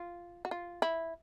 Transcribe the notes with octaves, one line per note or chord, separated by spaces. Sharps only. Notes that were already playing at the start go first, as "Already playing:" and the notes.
Already playing: F4
F#4
F4
E4